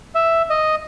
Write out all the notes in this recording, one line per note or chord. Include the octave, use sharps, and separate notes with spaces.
E5
D#5